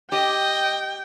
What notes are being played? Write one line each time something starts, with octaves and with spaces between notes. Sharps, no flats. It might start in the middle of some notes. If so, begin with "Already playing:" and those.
G4 D#5 G5